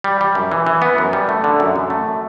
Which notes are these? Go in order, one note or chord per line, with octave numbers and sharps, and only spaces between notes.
G3
G3
F#2
E3
E3
B3
F#2
G3
A3
D3
F#2
F#2
A3